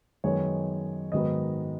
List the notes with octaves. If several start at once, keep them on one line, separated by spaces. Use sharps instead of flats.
F#2 D#3 G#3 B3 C#5
G#2 D#3 F#3 B3 D#5